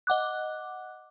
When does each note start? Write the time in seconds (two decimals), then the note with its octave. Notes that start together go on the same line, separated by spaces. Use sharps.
0.07 D#5 F#5 D6 F#6